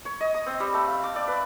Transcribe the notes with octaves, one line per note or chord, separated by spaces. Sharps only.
C#5
D#5
D#6
C4
G3
A3
F5
D6
D5
B4